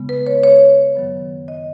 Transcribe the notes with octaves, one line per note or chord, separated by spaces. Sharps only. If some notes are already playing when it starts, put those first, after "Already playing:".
Already playing: C#3 G#3 B3
B4
C#5
C#5
F#2 D#3 F#3 B3
D#5